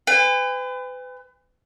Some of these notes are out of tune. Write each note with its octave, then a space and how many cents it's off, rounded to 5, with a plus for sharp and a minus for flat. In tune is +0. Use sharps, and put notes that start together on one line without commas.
B4 +35 G#5 -45